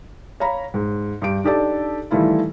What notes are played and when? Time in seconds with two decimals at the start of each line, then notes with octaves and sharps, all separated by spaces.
0.40 C#5 F5 A#5 B5
0.74 G#2
1.22 G2 G4 D7
1.44 D4 D#4 G4 A4 D5 A5
2.11 D#3 E3 G3 A3 E4 F4